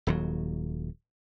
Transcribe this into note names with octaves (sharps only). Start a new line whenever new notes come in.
D#1 D#2 F#3